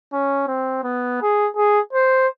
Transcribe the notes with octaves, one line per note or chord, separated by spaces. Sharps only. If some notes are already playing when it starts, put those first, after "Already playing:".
C#4
C4
B3
G#4
G#4
C5